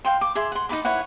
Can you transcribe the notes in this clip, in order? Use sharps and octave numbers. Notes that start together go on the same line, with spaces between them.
F5 G5 C6
D6
G#4 E5 C6
F#5 C6
D#4 F4 B5 D6
E4 B4 C#5 F#5